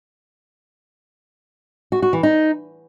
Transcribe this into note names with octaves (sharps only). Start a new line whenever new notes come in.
F#4
F#4
E3
D#4